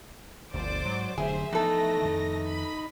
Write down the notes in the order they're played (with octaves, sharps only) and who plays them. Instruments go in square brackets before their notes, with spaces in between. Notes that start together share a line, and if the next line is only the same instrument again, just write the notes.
[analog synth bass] G1 [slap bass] D2 F3 [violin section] C5 D5 D6
[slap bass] G#2 [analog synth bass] F#3
[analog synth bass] F1 [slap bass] D3 F#3 A3 [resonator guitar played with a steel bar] G#4 [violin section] C5 E5
[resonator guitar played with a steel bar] E3 A4 [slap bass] F3 B3 [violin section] A3 A#6 [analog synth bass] D#4
[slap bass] F2 D#3
[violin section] B5